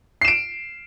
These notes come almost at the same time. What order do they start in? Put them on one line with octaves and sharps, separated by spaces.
C7 E7 D7